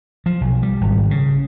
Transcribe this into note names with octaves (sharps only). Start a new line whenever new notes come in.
F3
B1
G3
G#1
C#3